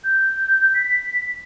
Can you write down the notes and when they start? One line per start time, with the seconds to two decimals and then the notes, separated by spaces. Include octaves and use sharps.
0.04 G6
0.75 B6